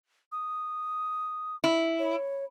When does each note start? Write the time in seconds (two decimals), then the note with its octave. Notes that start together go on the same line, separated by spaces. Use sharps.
0.32 D#6
1.64 E4
1.99 C#5